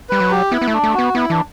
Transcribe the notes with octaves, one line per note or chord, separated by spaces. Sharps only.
G3 B4
F#3
G4
B3 E4
B3
A3
D4
A3
B3 F#4
B3 E4
E3 D4